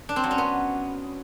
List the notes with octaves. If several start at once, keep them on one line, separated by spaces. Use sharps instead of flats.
D4
C4
F#3
C#4
B3